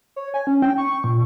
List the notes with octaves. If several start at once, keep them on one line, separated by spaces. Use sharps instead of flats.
C#5
G#5
C#4
G5
C#6
A#2